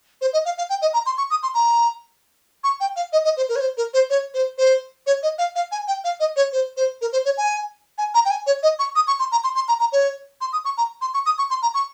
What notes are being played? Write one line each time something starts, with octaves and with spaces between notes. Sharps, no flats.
C5
D#5
F5
F5
G5
D#5
A#5
C6
C#6
D#6
C6
A#5
C#6
G5
F5
D#5
D#5
C5
A#4
C#5
C5
A#4
C5
C#5
C5
C5
C#5
D#5
F5
F5
G#5
G5
F5
D#5
C#5
C5
C5
A#4
C5
C#5
G#5
G#5
A#5
G5
G#5
C#5
D#5
C#6
D#6
C#6
C6
A#5
C6
C6
A#5
A#5
C#5
C6
D#6
C#6
A#5
C6
C#6
D#6
C#6
C6
A#5
C#6